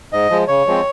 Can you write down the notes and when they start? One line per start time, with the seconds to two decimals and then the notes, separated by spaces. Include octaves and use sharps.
0.13 G#2 D#5
0.30 F3 G#3
0.48 C#3 C#5
0.67 F3 G#3 C4